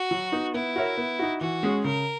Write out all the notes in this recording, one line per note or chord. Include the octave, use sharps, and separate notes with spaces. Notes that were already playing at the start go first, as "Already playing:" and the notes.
Already playing: F#4
F#3
B3 D#4
B3 E4
F#4 A#4 C#5 E5
B3
D#4 F#4
E3 F#4
G#3 C#4 G#4
C#3 A#4